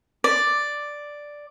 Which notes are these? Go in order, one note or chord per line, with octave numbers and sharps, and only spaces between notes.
D5